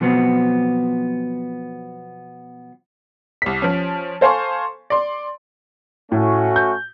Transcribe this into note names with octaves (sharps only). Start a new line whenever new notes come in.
B2 F3 F#3 B3 C4
C2 B6
F3 C#4
A4 C5 F5 G#5 C6 C#6
D5 C6
A2 A3 C#4 F#4
G6